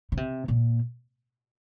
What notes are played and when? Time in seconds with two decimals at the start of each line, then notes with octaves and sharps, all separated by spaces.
0.12 C#3
0.17 C3
0.48 A#2